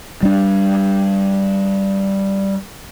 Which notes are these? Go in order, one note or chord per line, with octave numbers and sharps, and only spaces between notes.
G3 D4